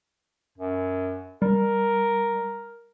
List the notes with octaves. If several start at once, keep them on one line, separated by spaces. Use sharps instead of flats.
F#2
G3 A#4